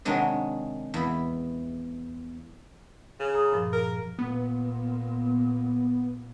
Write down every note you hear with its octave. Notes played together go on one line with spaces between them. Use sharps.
C3 D#3 F#3 G#3 D4
E2 B5
C#3
G#4 A#5 D#6
G2 A#2 F3
A#4
A#2 B3